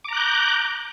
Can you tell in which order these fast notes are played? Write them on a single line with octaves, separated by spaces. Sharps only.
D6 A#5 F#6 G6